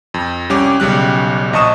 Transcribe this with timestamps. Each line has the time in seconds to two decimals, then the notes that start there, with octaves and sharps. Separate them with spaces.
0.14 F2
0.49 C2 G3 C#4 D6
0.80 B1 C#3 G3 F#6
1.53 A#1 D#5 A5 C#6 D#6 E7